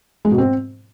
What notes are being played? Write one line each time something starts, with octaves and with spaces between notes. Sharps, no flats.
G#3
B2
C4